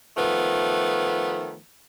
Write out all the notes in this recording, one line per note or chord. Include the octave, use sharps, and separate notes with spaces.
D#3 F3 A3 B3